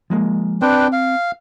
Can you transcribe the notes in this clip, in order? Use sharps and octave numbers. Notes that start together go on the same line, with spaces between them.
F3 G#3 A#3
C4 D4 B4 G5
F5